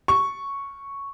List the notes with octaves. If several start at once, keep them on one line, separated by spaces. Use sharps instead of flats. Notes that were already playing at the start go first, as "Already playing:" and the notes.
C#6